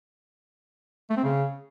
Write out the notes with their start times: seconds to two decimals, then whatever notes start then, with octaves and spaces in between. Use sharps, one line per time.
1.10 A3
1.17 C4
1.24 C#3